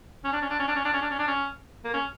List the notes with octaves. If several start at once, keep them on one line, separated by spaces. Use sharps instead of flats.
C#4
D4
C#4
D4
C#4
D4
C#4
D4
C#4
D4
C#4
D4
C#4
A#3
C#4